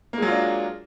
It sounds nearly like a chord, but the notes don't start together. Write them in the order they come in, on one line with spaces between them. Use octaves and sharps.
A#3 G#3 F#3 F4 D4